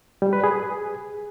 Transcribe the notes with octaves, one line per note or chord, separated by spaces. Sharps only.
G3
B4
G#4